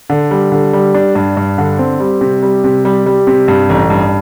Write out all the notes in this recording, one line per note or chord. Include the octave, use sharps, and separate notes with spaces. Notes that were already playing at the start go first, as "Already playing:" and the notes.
D3
G3
D3
G3
D4
G2
G2
D3
C4
G3
C3
G3
C3
G3
G3
C3
G2
A1
G2